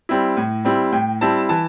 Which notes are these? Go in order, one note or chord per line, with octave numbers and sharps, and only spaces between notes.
G3 C4 E4
A2
G3 C4 E4
A2 G5
G3 C4 E4 A5
E3 A5